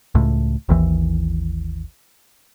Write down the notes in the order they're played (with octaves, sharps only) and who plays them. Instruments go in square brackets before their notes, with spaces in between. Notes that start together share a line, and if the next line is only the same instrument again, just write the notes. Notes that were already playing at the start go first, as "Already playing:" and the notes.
[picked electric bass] C#2 A2
G#1 D#2 E3